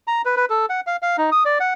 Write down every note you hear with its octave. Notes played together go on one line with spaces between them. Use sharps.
A#5
B4
B4
A4
F#5
F5
F5
D#4
D#6
D5
F#5